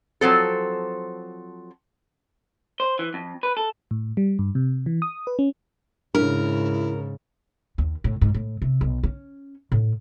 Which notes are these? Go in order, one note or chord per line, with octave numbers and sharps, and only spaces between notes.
F3 F#3 C4 A4
C5
E3
F2
B4
A4
A2
G3
G2
C3
E3
D#6
B4
C#4
G#2 C#3 D4 E4 A#4
D#2
A2
G#2
A2
C3
B1
C#4
A2